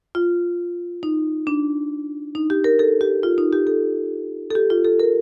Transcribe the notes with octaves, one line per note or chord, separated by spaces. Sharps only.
F4
D#4
D4
D#4
G4
A#4
A4
G4
F4
D#4
G4
A4
A4
G4
F4
A4
A#4